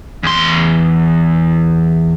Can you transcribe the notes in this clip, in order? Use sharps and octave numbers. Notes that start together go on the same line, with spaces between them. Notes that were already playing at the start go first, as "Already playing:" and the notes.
E2 C6